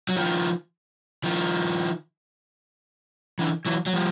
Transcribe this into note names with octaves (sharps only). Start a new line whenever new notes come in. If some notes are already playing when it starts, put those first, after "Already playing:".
F#3
D#3 F3
D#3 F3
D3 E3
E3 F#3
F#3
F3 G3